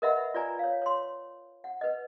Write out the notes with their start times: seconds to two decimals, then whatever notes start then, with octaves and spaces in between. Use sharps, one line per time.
0.02 A#4 B4 D#5 E5 F#5 B5
0.34 F4 B4 D5 G#5 A#5
0.59 C#5 F5
0.82 C#5 C6
1.64 F#5
1.81 B4 D#5